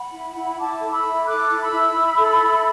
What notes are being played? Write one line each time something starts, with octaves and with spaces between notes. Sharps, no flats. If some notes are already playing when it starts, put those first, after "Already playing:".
Already playing: F#5 B5
E4
E4
E4 A5 D6
A4
B5 E6
E4
A4 D6 F#6
E4 D6
B5 E6
E4
E4
A4
E4
B5